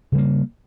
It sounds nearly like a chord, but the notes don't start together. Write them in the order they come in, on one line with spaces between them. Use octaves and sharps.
C#3 G3 A#3